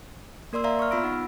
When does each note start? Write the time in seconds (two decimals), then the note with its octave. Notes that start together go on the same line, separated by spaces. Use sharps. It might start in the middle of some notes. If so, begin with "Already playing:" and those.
0.53 A#3 A#4 D5 C6 E6
0.64 D5 E5 F5 A#5 C6
0.79 C#6 F6
0.91 B3 F4 B5 E6 A#6 D7
1.04 D#4 F#5